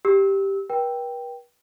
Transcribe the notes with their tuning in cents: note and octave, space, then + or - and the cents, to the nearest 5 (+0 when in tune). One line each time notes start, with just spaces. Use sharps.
G4 +0 E6 -25
B4 -45 G5 +0